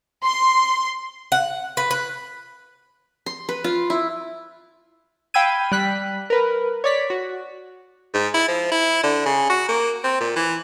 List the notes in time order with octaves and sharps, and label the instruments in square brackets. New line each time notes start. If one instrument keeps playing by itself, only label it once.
[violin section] C6
[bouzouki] F#5
B4
B4
[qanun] C6
B4
F4
E4
[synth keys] F5 G5 B5 E6 G#6 D#7
G3 F#6 B6
A#4 B4
C#5 D5 B6
F#4
[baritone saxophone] G#2
E4
F3
E4
D3
C#3
F#4
A#3
C4
A#2
E3